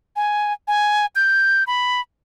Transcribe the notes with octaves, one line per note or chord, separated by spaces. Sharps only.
G#5
G#5
G6
B5